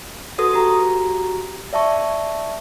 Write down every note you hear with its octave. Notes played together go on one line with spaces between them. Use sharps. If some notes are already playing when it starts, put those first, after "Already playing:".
F#4 A4 B4 D#6
F#4 G4 A#5
D5 E5 A5 C#6